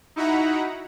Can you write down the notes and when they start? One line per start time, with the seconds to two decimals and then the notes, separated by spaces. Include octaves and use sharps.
0.16 D#4 E4 F#4 F#5 A#5 B5